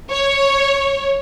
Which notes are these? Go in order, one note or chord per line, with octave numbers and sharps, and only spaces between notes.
C#5